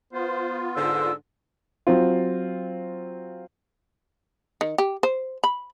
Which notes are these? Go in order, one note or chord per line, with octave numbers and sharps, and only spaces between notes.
B3 F4 C5
G#2 D3 C5 E6
F#3 C4 F4
D#3
G4
C5
B5